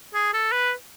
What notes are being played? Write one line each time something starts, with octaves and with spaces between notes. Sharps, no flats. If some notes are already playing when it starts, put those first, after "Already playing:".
G#4
A4
B4